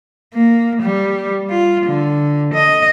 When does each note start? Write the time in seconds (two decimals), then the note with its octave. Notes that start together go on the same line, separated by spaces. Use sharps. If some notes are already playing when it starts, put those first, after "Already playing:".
0.34 A#3
0.82 G3
1.50 F4
1.86 D3
2.54 D#5